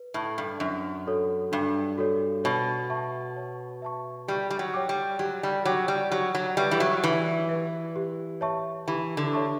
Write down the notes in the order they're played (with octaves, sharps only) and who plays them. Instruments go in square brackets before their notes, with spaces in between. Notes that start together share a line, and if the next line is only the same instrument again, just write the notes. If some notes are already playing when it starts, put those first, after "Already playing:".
Already playing: [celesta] B4
[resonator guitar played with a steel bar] A2 [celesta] E5 A5
[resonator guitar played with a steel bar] G2
[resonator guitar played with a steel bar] F#2 [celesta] D4
[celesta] F#4 A4 C#5
[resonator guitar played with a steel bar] G2 [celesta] D4
[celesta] F#4 A4 C#5
[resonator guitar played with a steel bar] B2 [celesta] C#5
[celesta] E5 A5 C#6
C#5
E5 A5 C#6
[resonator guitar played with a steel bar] G3 [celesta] G4
[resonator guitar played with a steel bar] G3
F#3
[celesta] C#5 G5 D6
[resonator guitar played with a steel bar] G3
[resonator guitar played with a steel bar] F#3 [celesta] G4
[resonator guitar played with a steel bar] G3
[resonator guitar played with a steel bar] F#3 [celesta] C#5 G5 D6
[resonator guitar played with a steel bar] G3
[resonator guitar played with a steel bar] F#3 [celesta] G4
[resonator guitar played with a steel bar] F#3
[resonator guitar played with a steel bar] G3 [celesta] B4 E5
[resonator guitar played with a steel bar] E3
F#3
[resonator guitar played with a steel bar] E3 [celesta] G4
[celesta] B4 E5
G4
C#5 E5 A5 C#6
[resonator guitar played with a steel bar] E3 [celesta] G4
[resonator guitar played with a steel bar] D3
[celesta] C#5 E5 A5 C#6